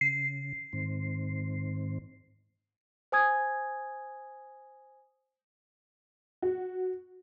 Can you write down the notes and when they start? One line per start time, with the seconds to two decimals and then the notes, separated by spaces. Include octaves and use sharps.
0.01 C#3 C7
0.73 G#2 D#3 C4
3.12 C5 G#5 D#6 G#6
6.42 F#4